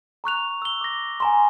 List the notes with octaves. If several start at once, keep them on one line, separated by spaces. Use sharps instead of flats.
A#5 C#6 F#6 F7
E6 G7
D6 A#6
G#5 A#5 C6